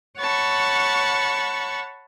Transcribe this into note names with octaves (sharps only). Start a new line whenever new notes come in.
C#5 F#5 A5 B5 C#6